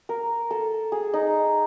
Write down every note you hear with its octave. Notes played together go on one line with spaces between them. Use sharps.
A#4
A4
G#4
D#4